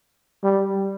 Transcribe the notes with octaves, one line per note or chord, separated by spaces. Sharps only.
G3